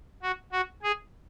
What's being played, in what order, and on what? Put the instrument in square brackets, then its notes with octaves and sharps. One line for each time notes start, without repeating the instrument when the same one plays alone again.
[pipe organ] F#4
F#4
G#4